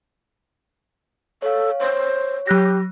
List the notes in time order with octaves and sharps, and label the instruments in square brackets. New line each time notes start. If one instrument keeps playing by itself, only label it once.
[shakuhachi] A4 [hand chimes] C#5 F5
[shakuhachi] C5 [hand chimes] C#5
[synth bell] F#3 F#6 A#6 [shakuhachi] G4